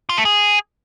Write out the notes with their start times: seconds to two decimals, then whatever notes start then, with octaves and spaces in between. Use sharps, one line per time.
0.09 F4
0.17 A3
0.25 G#4